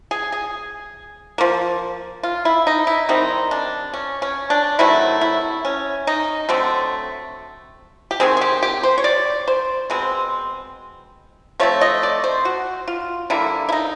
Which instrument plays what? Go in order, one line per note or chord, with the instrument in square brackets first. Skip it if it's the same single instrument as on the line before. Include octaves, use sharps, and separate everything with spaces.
[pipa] G#4
G#4
F3 A#3
F4
E4
D#4
E4
D#3 G3 C4 D#4
D4
C#4
C#4
D4
C3 D#3 F#3 A3 E4
E4
C#4
D#4
D3 F#3 A3 C4
G4
D#3 G#3 C4 G#4
G#4
G4
G4
C5
C#5
D5
C5
B2 G#3 C4
F3 A3 C4 C#5
D#5
D5
C5
F#4
F4
D3 G3 A#3 E4
E4
D#4